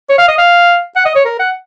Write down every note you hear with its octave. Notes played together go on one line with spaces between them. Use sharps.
C#5
F5
D#5
F5
F#5
D#5
C#5
A#4
F#5